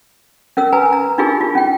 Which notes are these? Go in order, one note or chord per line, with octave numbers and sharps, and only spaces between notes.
C#4 A#4 E6
A#4 B4 G#5 A#5
A#5
D4 D#4 F4 G4 G#4 A#4
F4
C#4 G5